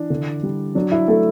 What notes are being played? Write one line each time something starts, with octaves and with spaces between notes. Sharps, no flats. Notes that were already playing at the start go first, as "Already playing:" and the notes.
Already playing: E3 D4
D3
G3
F#3 D4
E4
A3 A4